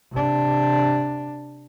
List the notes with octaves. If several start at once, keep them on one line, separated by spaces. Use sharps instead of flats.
C3 D4